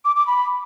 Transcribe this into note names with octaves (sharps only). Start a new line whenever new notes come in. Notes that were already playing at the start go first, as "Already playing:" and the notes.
D6
D6
B5